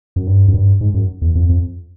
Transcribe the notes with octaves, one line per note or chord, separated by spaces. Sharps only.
F#2
G2
F#2
G2
G#2
F#2
E2
F2
F2